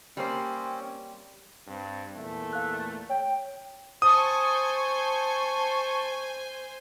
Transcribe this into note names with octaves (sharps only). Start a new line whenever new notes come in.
G3 A#3 C4 C#4 C5
G2 C4
E2 A#2 A3
F5 F#6
C#5 G5
C5 G#5 A5 C#6 D#6